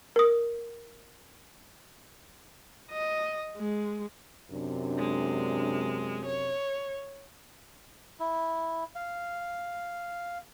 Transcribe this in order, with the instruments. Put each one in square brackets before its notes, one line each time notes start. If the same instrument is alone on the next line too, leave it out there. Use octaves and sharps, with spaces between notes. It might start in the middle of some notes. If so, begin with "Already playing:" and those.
[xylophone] A#4 D#6
[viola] D#5
G#3
[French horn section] F#2 C3 D4
[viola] G#3
C#5
[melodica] E4
F5